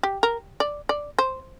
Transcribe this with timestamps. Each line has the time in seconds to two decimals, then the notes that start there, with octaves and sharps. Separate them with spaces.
0.03 G4
0.23 A#4
0.60 D5
0.89 D5
1.19 C5